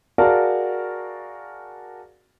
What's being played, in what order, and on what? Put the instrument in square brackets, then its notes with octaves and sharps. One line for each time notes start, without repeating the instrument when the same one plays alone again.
[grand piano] F#4 G#4 A#4 D5 F5 A5